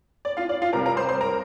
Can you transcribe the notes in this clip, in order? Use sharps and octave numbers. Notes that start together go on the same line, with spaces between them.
D5
F4 F5
D5
F4 F5
C2 C3 G3 A#4 A#5
A#4 A#5
C5 C6
C5 C6
A#4 A#5